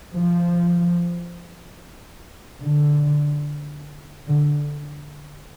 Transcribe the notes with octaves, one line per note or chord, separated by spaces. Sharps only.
F3
D3
D3